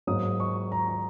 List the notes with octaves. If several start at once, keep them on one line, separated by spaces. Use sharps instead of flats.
G#2 F#3 A#3 D#6
C#6
A#5
A#5